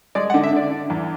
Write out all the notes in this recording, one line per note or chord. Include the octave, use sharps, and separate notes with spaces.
G#3 D5
F#5
D3
E5
D3 D5
D3
E2